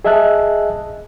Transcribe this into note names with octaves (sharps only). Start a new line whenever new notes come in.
G#4 D#5 E5 G#5 A5 F#6